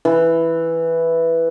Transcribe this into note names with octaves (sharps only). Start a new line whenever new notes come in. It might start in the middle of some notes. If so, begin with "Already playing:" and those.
E3